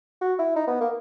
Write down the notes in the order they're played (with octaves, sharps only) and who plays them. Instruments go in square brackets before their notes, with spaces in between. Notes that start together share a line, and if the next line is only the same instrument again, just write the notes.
[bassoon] F#4
E4
D#4
B3
A#3